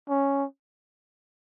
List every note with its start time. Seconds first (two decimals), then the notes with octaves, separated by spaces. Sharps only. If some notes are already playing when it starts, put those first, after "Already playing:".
0.09 C#4